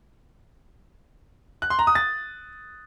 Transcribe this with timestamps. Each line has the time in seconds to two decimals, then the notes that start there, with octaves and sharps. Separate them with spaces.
1.62 F#6
1.70 C6
1.79 A#5
1.87 D#6
1.95 A6